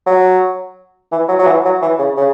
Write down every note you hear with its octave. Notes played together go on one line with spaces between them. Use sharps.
F#3
E3
F#3
F#3
E3
F#3
E3
C#3
C#3